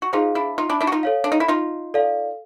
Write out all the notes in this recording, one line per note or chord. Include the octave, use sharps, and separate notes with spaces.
F#4
D#4 F4 G#4 C5 F5
D4 E4
D#4 F4
D4 E4
D4 E4
F#4
D#4 F4
A4 C#5 F5
D4
D#4
E4
D#4 F4
A4 D5 F5